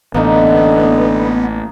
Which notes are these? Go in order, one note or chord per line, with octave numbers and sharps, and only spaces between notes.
A1 D3 A#3 B3 D#4